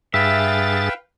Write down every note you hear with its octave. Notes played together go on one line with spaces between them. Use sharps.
G2 G#4 B4 E5 F5 G5 A6